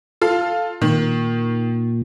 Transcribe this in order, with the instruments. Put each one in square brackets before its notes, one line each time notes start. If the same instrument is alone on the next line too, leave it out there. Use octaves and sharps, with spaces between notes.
[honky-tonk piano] F4 A4 F5
[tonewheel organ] A#2 [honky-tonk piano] D#3